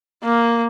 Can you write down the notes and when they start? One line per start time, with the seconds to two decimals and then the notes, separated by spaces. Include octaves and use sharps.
0.24 A#3